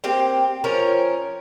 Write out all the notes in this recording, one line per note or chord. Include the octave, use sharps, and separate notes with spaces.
A#3 C4 G4
F3 C#4 A#4 C#5